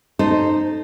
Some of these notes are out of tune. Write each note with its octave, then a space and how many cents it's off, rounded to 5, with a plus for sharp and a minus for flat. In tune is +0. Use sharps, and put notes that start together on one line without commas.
D#4 -15 A4 +0 C5 +0